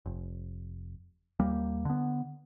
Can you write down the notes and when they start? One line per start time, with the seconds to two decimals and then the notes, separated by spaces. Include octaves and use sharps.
0.06 F1
1.40 D#2 G3 A#3
1.85 D3 B3